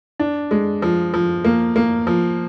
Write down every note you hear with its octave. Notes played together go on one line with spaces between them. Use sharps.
D4
G#3
F3
F3
A#3
A#3
F3